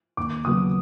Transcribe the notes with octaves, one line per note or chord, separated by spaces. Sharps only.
D#2 D6
C#3 F#3 B3 D#6